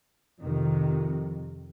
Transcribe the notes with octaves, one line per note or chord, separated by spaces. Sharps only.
F2 C3 D#3